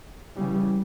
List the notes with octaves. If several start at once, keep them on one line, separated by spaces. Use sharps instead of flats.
C#3 E3 G3